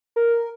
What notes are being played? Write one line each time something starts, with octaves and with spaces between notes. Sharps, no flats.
A#4